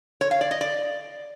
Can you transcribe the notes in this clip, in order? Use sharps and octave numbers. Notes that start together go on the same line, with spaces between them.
C#5
F5
D5
D#5
D5